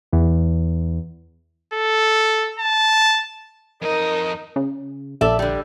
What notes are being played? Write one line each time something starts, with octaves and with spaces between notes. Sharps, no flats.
E2
A4
A5
F2 D#4 A#4 D#5
C#3
A#1 A4 D5 E5
D3 G3